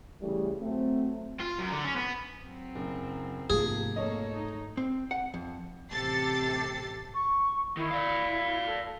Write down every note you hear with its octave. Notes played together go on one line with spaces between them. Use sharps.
C#3 E3 G3 A3
F#3 A3 C4
F4
F#2
D3
C#4
B3
F#3 C4
F#1
G#2 C3 F3 A3 A#3 G#4
F2 A#3 A4 C#5 D#5
D#4
C4
F#5
F2
A1 C3 G4 A4 A6 C7
C#6
D#3 E4
D5 F5
A4